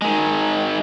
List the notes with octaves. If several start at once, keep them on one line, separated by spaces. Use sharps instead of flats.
D#3 G#3